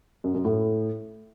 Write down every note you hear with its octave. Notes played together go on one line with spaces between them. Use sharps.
F#2
F#2
A2